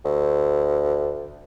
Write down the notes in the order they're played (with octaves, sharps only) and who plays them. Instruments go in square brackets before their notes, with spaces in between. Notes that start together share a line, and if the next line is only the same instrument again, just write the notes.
[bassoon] D2